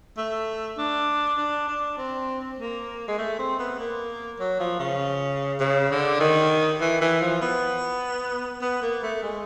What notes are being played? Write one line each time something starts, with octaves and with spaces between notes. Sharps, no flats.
A3
D4
D4
D4
C4
A#3
G#3
A3
C4
B3
A#3
F#3
F3
C#3
C#3
D3
D#3
E3
E3
F3
B3
B3
A#3
A3
G#3